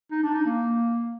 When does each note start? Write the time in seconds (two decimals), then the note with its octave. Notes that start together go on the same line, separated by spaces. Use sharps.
0.12 D#4
0.23 D4
0.35 D#4
0.46 A#3